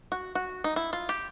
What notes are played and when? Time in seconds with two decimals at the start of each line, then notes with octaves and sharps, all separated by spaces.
0.12 F#4
0.35 F#4
0.64 D#4
0.76 E4
0.93 F4
1.09 G4